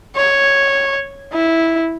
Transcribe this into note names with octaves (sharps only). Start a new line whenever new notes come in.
C#5
E4